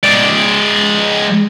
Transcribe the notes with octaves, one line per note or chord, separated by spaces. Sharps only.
G#3 D5